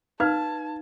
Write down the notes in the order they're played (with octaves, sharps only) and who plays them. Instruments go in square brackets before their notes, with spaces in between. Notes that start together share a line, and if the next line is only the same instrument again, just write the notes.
[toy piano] D#4 B4 F5 [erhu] A5 [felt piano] F6 G#6